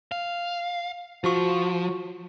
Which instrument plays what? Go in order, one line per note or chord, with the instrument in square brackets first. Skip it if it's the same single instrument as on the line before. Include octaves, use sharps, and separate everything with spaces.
[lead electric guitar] F5
[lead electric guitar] F3 [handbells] F4 F#4 C#6